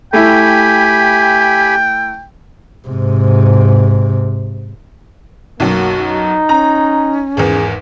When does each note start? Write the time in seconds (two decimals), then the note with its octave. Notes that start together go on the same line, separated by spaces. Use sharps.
0.13 A3 E4 G4 G5 G#5 B5
2.88 G#2 C3
5.60 B1 F#2 A#3 F#4
6.01 D#4
6.49 C#4 A#5
7.37 G#1 E2 G#4